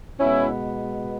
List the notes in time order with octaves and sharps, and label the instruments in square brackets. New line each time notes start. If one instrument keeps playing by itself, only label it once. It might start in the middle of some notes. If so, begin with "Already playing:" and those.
[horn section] B2 G#3 B3 C#4 E4